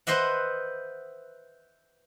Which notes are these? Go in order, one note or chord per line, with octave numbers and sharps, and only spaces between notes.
B4 C5 D#5 E5 F#5